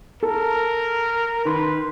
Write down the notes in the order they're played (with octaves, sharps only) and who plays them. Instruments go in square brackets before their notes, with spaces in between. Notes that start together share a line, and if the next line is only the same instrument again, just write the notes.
[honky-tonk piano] A4 [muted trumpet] A#4
[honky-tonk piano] D#3 C6 [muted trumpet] B4